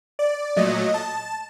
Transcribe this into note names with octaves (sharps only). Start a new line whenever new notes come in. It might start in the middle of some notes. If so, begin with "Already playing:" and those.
D5
A#2 F#3 A3 D#5
A5